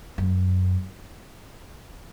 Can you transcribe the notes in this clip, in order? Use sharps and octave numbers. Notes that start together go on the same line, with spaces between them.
F#2